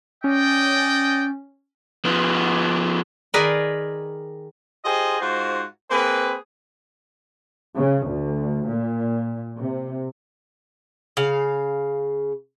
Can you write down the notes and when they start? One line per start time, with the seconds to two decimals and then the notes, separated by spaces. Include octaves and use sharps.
0.24 C#4 D5 D#5 G5
2.05 F3 B3
3.34 D#3 G#4 A#4 B4 D5
4.84 F4 G4 G#4 C5 D#5
5.20 G#2 F4 F#4 C5
5.91 A#3 C4 G#4 B4
7.76 C#3
8.08 D2
8.67 A#2
9.59 C3
11.17 C#3 F5